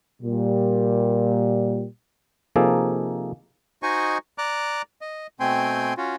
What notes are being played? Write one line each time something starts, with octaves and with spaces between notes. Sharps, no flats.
A#2 G3
C3 F3 A#3 D#4 G#4 A4
D#4 F#4 C5 D#5 G#5 C#6
D5 A#5 D6 F#6
D#5
B2 A3 C4 G5 G#5 C6
C#4 F4 F#4